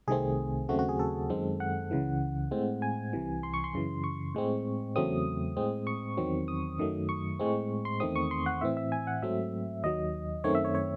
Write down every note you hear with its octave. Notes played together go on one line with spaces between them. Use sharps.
C2 C3 D#3 A3 C4 G#4
D#2 C#3 F#3 A3 C4 F#4
F#4
G#4
A4
F#2 D#3 G#3 C4
F#5
C#2 C#3 E3
A2 G#3 C4
G#5
C2 C3 E3
C6
C#6
C6
F#2 C#3 E3
C#6
A2 G#3 C4
E2 C#3 F#3 A3 C4 D#6
A2 G#3 C4
C#6
E2 D#3 F#3 C4
D#6
F#2 D#3 F#3 A3
C#6
A2 G#3 C4
C6
E2 D#3 A3 C4 D#6
C#6
C6
F#5
A2 E3 C4 E5
E5
G#5
F#5
G#2 F#3 A3 C4 E5
D#2 D#3 F#3 D#5
F#2 D#3 A3 C4 C#5
E5
C#5
C#5